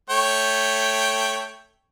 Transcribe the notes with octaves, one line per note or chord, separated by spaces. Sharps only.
A3 C#5 G5